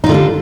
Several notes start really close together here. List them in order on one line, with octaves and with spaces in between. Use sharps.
D#4 F4 D3 G3 D4